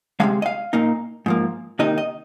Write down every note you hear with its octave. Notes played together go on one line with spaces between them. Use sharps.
C3 F3 G#3 F5
D#5
F5
A#2 A#3 D#4
G#2 F3 A#3
C3 D#3 A#3 D#4 D#5
D#5